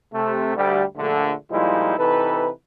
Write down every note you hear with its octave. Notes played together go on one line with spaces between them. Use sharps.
C3 A3
D2 G3
A#1 D3 A3
A#2 F3 G3 G#3 D#4 E4
C3 E3 D#4 A4 B4